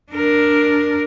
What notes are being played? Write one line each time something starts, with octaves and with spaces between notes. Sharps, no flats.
D4 A#4